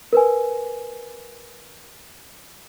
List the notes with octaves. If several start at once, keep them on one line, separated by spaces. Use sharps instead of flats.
A#4 B4 G#5